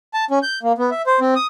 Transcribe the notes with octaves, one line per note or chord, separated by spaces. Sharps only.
A5
C#4
G6
A#3
B3
E5
C5
C4
D#6